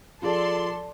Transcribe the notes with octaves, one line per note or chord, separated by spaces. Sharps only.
F3 F4 G#4 A4 D5 C6